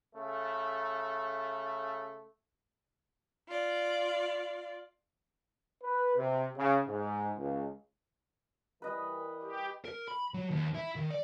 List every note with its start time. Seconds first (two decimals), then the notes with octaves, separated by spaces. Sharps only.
0.16 C#3 A3
3.48 F4 D5
5.83 B4
6.17 C3
6.58 C#3
6.87 G#2
7.38 C#2
8.82 E3 G3 A#4 B4 D#5
9.42 G4
9.85 A#4
10.08 B5
10.34 F#3
10.51 D#2
10.74 E4
10.96 D#3
11.10 D5